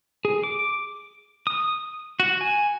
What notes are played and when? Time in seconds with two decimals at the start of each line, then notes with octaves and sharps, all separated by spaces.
0.25 G#4
0.43 D6
1.47 D#6
2.20 F#4
2.41 G#5